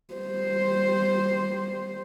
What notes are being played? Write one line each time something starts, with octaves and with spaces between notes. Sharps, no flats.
G3 C5